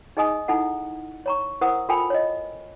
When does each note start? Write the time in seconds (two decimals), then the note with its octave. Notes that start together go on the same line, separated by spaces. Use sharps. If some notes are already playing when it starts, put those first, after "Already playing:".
0.17 D#4 G#4 D#5 G#5 D#6
0.48 D#4 E4 A4 F#5
1.26 C#5 A#5 C#6
1.61 E4 A#4 C5 F#5 D#6
1.89 F4 A4 A#4 G5 G#5 B5
2.10 C#5 D#5